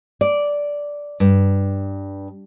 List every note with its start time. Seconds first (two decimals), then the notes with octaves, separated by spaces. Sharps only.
0.21 D5
1.20 G2